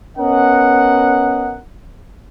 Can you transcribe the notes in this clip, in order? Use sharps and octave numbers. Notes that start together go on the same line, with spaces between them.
B3 C#4 A#4 D#5 F#5